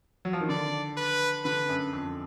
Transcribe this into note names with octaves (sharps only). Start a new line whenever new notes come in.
F#3
F3
D#3
D3 D5
B4
D3 B4
F#2
F2